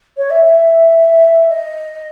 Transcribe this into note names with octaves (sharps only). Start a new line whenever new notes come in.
C#5
E5
E5
D#5